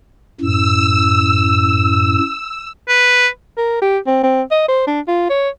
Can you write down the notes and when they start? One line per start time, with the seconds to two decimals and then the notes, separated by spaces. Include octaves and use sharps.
0.41 F#2 A2 E6
2.89 B4
3.57 A#4
3.81 G4
4.06 C4
4.23 C4
4.51 D#5
4.68 C5
4.87 D4
5.08 F4
5.30 C#5